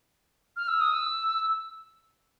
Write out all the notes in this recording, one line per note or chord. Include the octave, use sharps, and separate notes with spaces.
F6
E6
D#6
E6